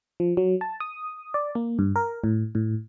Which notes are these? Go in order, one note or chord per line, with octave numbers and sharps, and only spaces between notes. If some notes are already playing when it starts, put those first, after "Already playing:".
F3
F#3
A5
D#6
D5
A#3
G2
A#4
A2
A2